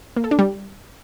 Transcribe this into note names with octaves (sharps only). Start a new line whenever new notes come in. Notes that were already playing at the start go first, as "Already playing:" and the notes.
A#3
A4
D4
G3